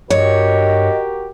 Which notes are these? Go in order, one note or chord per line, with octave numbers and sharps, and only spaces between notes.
G2 F#4 G4 A#4 C#5 D#5